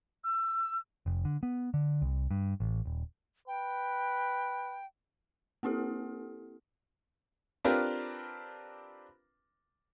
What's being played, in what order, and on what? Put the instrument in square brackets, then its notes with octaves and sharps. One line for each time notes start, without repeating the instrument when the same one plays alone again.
[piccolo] E6
[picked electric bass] F1
D3
B3
D3
C2
G2
A1
D#1
[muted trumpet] B4 [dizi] G5
[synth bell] A#3 C4 E4 G4 A4
[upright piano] C4 D4 F4 G4 A#4 B4